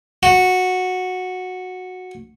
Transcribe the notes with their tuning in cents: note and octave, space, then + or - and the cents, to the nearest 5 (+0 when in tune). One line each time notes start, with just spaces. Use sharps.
F#4 -10